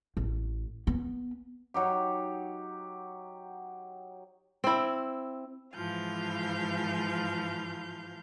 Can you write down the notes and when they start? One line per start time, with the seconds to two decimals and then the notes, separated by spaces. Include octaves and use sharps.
0.17 A1
0.87 B3
1.74 F#3 D#4 G4
4.64 C4 E4
5.75 G#2 E3 F3 F5 G6